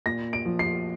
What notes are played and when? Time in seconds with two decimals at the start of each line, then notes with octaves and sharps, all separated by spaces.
0.06 A#2 A#6
0.33 D7
0.46 F3
0.59 C7